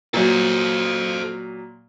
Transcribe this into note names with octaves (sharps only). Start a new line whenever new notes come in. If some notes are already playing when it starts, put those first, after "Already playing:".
A#2 F#3 A4 C5